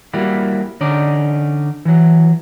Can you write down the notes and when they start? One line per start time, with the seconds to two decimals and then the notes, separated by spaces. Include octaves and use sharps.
0.13 G3 A#3 E4 F#4
0.81 D3 C#4 D#4 D5
1.85 E3 F#3